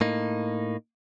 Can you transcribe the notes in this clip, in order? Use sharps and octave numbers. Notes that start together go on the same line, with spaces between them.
A2 A#3 D#4